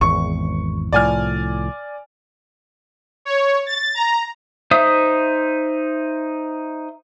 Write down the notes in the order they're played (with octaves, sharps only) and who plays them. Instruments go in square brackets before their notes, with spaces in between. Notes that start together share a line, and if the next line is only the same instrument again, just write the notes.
[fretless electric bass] G#1 E2 [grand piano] C#6
[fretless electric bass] C2 A2 F3 [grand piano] D5 G#5 F6
[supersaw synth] C#5
A6
A#5
[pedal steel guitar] D#4 C5 E5 D#6